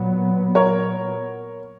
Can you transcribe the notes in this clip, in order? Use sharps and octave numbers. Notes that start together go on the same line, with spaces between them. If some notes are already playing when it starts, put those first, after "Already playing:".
Already playing: A#2 F#3 B3
A#4 C#5